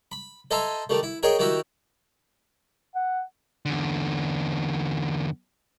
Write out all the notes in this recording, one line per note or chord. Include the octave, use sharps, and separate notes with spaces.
B5
A4 C5 D#5 E5 G#5 A#5
D#3 G3 A3
E4
G#4 A#4 C#5 D#5 G5
D#3 E4 F#4 G4 E5
F#5
E2 D3